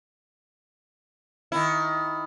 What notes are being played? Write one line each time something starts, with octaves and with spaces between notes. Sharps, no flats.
D#3 E4